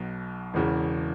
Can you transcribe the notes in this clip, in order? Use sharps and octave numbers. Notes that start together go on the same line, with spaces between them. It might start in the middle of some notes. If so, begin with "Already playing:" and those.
Already playing: B1 B2
E1 E2 C#3 E3